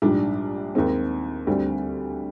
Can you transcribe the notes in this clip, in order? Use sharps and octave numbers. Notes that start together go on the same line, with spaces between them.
A#1 G#2 G3 D4
D#2 D#3 G#3 C4
D2 D3 G3 C4